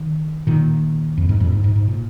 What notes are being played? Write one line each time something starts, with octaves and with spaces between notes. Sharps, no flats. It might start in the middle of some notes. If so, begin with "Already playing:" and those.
Already playing: D#3
A#2 D#3
F2
G#2
F2 A#2
G#2
G#2
G#2
A#2